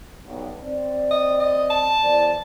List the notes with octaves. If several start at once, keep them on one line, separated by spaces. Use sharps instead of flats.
B1 G2
C4 D5
D#5
D#5
A5
E2 C5 D5